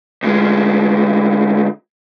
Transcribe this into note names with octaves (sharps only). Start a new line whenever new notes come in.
D2 G#3